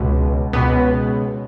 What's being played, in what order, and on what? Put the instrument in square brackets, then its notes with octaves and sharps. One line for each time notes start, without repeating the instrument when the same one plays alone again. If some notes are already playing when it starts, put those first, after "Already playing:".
Already playing: [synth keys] C#2 B2
C#2 B2 B3